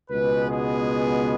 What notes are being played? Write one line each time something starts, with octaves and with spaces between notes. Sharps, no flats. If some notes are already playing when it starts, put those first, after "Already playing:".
C#2 B2 G#3 B3 B4
G#4